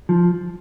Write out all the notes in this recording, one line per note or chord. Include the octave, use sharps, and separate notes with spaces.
F3